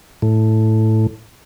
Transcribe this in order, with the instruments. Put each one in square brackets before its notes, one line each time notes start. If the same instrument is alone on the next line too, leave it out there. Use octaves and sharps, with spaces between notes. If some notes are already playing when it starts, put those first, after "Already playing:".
[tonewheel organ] A2